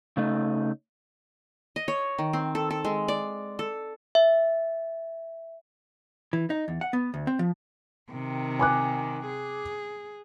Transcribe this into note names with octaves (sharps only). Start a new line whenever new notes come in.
C#3 A3 D#4
D#5
C#5
D#3
C4
A4
A4
G#3
D5
A4
E5
E3
D#4
E2
F#5
B3
D2
C4
F3
C3 D#3
G#5 D6 F#6
G#4